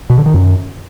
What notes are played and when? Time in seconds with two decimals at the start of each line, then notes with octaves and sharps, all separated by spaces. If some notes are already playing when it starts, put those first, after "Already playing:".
0.10 B2
0.18 D3
0.26 D#3
0.34 F#2